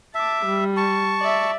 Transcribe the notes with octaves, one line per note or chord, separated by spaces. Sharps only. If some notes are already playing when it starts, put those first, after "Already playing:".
E5 A5 D6
G3
A5 C#6
D5 E5